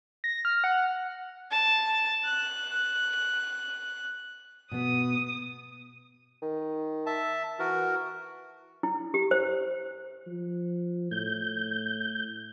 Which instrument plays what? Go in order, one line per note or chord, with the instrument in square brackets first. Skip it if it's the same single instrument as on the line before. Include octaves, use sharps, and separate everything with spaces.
[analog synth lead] A#6
F6
F#5
[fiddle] A5
F#6
[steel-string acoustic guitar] B2 B3 [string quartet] D#6
[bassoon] D#3
[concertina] E5 A5
[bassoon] E3 [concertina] F#4 A#4
[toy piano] E4
G4
C5
[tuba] F3
[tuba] A2 [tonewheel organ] G6